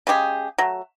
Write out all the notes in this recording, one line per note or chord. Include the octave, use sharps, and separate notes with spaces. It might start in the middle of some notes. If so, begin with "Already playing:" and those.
C#3 G#3 G4 G#4
F#3 A3